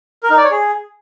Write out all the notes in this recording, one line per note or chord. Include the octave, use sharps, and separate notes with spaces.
A#4
D#4
D5
C#5
G#4